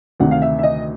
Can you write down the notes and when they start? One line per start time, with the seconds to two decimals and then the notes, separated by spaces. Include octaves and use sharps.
0.20 D2 C3 D#3 F#5
0.31 F5
0.42 E5
0.59 E5
0.63 D#5